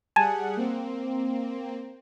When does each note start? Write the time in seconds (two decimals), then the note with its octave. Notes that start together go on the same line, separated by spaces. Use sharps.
0.16 G3 G#4 F#5 G#5 A5
0.57 A#3 C4